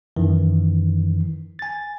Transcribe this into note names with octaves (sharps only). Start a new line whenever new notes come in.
F#2 D#3 E3
G#5 A6